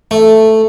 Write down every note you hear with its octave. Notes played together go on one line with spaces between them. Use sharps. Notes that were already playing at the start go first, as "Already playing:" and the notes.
A3